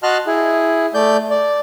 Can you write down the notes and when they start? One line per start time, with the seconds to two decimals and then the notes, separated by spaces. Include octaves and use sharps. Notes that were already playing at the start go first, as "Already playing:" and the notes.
0.03 F#4 D#5 A5 C6 F6 F#6
0.27 E4 G#4
0.94 A3 D5 G6
1.30 D5